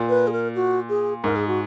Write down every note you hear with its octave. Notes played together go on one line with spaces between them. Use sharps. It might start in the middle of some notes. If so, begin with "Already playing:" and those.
Already playing: A#2
B4
G#4
A#4
F#4
G#4
G#2 A#4
G#4
F#4